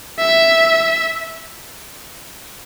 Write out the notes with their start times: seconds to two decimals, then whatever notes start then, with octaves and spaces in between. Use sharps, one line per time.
0.19 E5